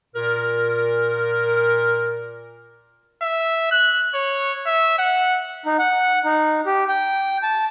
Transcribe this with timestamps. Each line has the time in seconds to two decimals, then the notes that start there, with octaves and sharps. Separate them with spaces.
0.15 A#2 A#4
3.22 E5
3.71 F#6
4.15 C#5
4.66 E5
4.99 F#5
5.65 D#4
5.79 F#5
6.25 D#4
6.66 G4
6.88 G5
7.43 A5